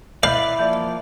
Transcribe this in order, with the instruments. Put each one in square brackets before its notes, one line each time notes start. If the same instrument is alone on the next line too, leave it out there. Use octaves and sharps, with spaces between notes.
[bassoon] E4 [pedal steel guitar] B4 D5 [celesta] D#5 G6 [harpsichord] F5
[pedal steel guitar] F3 A#3 [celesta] D5 E5 G6